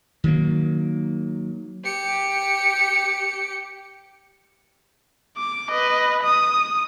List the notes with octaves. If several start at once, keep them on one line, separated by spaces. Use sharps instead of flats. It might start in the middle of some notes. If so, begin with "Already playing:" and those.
D#3 F#3 A#3
G4 C#7
D6
B4 D#5
D#6